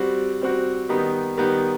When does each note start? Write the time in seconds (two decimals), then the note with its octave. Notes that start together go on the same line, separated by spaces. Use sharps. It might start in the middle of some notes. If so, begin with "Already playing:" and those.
Already playing: G3 C4 F#4
0.42 G3 C4 F#4
0.89 D#3 G3 B3 D#4
1.38 D#3 G3 B3 D#4